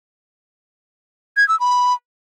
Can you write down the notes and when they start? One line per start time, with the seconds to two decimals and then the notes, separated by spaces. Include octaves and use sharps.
1.37 G#6
1.49 E6
1.60 B5